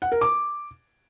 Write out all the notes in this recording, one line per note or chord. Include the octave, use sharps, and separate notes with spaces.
F#5
A#4
D6